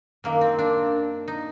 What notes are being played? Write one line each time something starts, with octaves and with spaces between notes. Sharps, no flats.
F#2 D#3 A#3
C4
D4
D#4